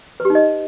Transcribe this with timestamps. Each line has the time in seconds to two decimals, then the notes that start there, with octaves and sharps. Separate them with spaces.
0.20 B4
0.25 G4
0.30 D#4
0.35 D#5